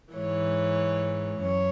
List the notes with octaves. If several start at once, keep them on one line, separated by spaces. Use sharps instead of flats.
G#2 E3 C#5
F#2 C#5